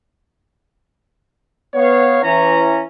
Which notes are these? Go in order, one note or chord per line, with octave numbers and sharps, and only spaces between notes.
B3 C#5 F5
E3 C#4 A#5